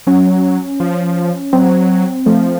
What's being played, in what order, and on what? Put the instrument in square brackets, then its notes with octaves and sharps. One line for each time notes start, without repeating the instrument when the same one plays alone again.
[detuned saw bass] F#3 [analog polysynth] C#4
[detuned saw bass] F3
[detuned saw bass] F#3 [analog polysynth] C4
[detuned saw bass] F3 [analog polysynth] A3